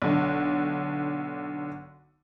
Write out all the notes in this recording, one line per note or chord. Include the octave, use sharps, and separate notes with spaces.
B1 D3